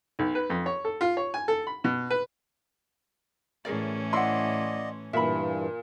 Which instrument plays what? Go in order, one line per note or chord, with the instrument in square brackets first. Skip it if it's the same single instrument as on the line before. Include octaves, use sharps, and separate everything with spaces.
[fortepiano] B1
B4
F2
C#5
A4
F4
C#5
G#5
A4
B5
B2
B4
[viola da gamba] A2 E3 C#4 [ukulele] G#4 A#4 D5
[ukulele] E4 F#5 [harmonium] D5 D#5 [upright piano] C6
[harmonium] G2 E3 [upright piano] A#2 [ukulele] E5 B5